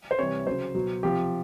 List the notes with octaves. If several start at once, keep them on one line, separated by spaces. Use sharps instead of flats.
C5
C3 E3 G3 C#5
C#3 F#3 C5
B2 F#3
C3 F3 G4